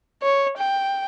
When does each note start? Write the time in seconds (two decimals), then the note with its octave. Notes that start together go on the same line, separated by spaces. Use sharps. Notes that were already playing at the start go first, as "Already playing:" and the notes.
0.23 C#5
0.58 G5